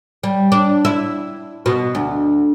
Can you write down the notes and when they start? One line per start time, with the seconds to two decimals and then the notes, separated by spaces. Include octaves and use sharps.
0.23 G3
0.52 D4
0.85 E4
1.66 B2
1.95 D2